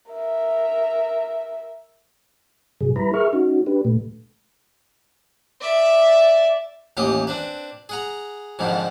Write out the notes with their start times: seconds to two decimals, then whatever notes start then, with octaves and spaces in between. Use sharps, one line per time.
0.10 A#4 E5
2.81 G2 C3 F#3 G#4
2.96 G3 E4 B4 A#5 B5
3.14 G#4 A#4 E5 C#6 F6
3.33 C#4 D#4 F#4
3.67 D4 G4 B4
3.85 A#2 A3
5.61 D5 E5
6.97 A1 D#2 E3 G4 D#6
7.27 C4 D4 B4
7.89 G#4 F#5 A#5
8.59 F2 G#2 D3 D#3 F3